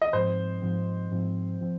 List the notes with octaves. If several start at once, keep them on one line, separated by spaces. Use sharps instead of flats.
D#5
G#2 F3 C4 C5
G#2 F3 C4
G#2 F3 C4
F3 C4